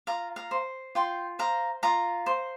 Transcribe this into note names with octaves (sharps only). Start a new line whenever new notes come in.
F4 F5 A#5
F5 A#5
C5
F4 G5 C6
C5 F5 A#5
F4 F5 A#5
C5